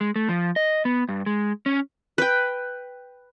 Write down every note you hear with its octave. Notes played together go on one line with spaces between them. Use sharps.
G#3
A3
F3
D#5
B3
G2
G#3
C#4
B4 G5